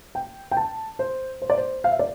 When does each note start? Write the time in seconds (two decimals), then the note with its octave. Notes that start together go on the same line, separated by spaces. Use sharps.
0.15 G5
0.51 G5
0.57 A5
0.99 C5
1.42 C5
1.50 D5
1.57 C5
1.84 F5
1.91 E5
1.99 D5